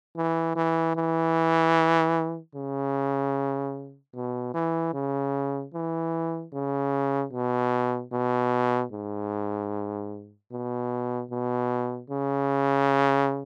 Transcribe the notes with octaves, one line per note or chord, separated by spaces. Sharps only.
E3
E3
E3
C#3
B2
E3
C#3
E3
C#3
B2
B2
G#2
B2
B2
C#3